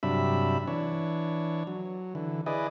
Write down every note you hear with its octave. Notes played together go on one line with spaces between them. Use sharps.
G2 C3 F#3 D4 E5 B5
E3 D4 C#5
F#3
D3 E3
E4 G#4 B4 D5 D#5